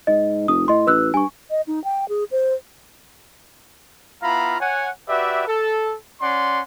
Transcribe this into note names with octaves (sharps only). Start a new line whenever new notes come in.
G#2 D#5
F1 D#6
A2 D#5 C6
A1 B4 E6 F#6
G2 G#5 C#6
D#5
D#4
G5
G#4
C5
B3 E4 F4 F5 A#5 B5
C#5 F#5 G#5
F#4 G4 B4 D5 E5
A4
C#4 D5 F#5 C6